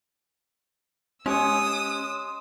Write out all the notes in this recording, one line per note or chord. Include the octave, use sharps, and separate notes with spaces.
G#3 C#4 G4 C#5 D#6 E6